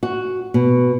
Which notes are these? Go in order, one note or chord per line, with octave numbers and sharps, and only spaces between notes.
F#4
B2